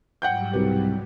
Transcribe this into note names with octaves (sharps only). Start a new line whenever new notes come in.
G#2 F#3 G3 F#5 G5 G6
C2 B2 G4 B4